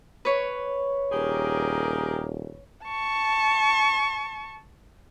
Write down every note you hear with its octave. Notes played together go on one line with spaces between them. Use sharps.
B4 C#5
D#1 G4 G#4 A#4
A5 C#6